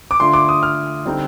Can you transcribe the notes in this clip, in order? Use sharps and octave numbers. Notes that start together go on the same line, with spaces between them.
D6
D3 A3 D4 F4 C6
D6
D#6
F6
D3 G3 C4 D#4